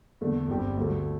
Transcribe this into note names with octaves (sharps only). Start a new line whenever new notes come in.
E2 D3 A3 D4
G1 G2 G3 C4 G4
D2 D3 A3